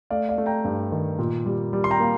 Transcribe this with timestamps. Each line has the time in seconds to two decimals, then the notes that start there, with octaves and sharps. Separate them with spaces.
0.10 A3 D5 F5
0.29 D5 F5
0.38 A3
0.46 G5 A#5
0.65 G2
0.92 D#3
1.19 A#2
1.46 G3
1.73 G3
1.84 C6
1.91 G5 A#5
2.00 A#3